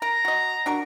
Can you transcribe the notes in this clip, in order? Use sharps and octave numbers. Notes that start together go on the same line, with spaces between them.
A#4 A#5
F#4 D#5
D4 F#4 A#4